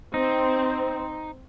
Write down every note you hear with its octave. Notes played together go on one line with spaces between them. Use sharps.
C4 D#4